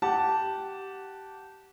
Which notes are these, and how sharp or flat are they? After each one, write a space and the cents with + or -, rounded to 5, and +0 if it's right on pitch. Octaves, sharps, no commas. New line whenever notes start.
G4 -15 F#5 +0 A5 +0